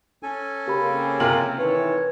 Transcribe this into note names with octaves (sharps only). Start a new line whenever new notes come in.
C#4 A4 G#5
C#3 A#3 C4 G4 B5
C3 F4 A#4 F#7
D#3 E3 A4 B4 C#5